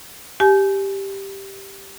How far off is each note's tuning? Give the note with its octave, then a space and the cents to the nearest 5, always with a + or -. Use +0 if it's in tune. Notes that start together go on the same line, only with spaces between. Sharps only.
G4 +0 G#5 +30